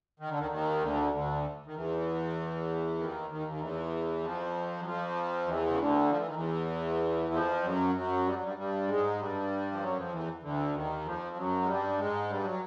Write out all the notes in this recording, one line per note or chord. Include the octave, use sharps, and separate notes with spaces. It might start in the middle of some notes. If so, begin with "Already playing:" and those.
D#3
D3
D#2 D#3
D#2 D#3
D2 D3
D2 D3
D#3
E2 E3
D#2 D#3
D#2 D#3
D#3
E2 E3
F2 F3
F#3
F2 F3
E2 E3
C#3
D2 D3
F3
E3
D#3
E2 E3
F2 F3
F#2 F#3
F#2 F#3
G3
F#3
G2 G3
G2 G3
G#2 G#3
G2 G3
F3
F#2 F#3
F2 F3
E2 E3
D2 D3
D#2 D#3
F2 F3
F#2 F#3
G#3
G2 G3
G#2 G#3
G2 G3
F#3